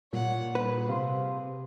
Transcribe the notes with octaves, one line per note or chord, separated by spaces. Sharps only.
A#2 G3 C#5 F#5
G#4 B4
C3 F5 C6